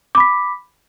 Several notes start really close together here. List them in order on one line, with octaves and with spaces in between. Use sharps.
D6 B5 B6